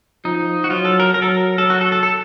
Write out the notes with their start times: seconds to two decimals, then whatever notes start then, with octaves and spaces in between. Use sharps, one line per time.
0.25 F3 D#4
0.64 F#4
0.70 F#3 F4
0.85 A4
1.00 A#4
1.14 F#3 A#4
1.22 A4
1.30 A#4
1.58 F#3 A4
1.70 F#4
1.81 A4
1.92 A4
2.03 A4